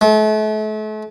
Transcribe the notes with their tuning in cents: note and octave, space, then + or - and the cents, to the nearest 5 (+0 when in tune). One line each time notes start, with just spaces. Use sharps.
A3 -40